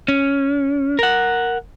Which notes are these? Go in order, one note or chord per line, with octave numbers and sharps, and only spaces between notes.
C#4
A#4 F#5